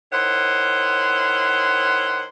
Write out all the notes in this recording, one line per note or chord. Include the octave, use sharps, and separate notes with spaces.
D#3 E4 C5 C#5 F#5